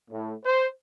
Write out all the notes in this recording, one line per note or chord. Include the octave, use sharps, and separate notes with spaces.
A2
C5